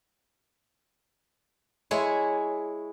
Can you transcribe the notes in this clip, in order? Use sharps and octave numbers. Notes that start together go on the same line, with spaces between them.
G#3 E4 C#5